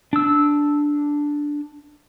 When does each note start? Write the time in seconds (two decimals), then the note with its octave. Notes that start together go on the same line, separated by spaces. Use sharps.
0.13 D4 E6